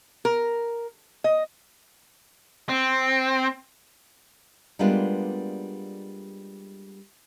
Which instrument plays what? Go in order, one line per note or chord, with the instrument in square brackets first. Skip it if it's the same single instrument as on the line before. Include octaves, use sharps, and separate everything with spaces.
[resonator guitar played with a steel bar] A#4
D#5
[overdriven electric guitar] C4
[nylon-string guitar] G3 G#3 A#3 B3 D4 F4